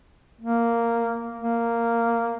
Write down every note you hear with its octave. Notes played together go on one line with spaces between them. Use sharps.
A#3
A#3